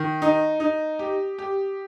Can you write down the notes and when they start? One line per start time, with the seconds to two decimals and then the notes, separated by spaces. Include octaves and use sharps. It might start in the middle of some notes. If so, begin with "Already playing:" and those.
Already playing: D#3
0.22 D#4
0.60 D#4
0.99 G4
1.39 G4